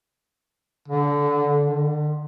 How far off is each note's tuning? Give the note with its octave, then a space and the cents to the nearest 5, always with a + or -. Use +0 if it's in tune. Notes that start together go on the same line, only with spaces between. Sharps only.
D3 -15
D3 +40